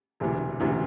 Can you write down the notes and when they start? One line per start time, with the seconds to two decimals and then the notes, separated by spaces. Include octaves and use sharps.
0.20 E1 D2 C3 E3
0.60 E1 D2 C3 E3